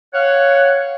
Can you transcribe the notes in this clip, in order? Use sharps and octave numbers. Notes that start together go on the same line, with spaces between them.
C#5 F5 F#5